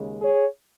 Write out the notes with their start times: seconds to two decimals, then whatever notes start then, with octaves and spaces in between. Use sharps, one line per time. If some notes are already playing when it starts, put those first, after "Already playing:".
Already playing: D#2 C#3 G#3
0.21 G#4 C#5